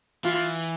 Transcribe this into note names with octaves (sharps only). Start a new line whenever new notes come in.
E3 F4